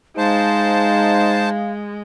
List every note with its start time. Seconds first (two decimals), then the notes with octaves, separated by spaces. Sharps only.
0.18 G#3 D#4 C5 F5 A5